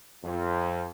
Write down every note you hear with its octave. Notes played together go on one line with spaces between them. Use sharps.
F2